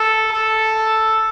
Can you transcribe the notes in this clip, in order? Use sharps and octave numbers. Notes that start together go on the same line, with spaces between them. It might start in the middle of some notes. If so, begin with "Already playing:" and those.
Already playing: A4
A4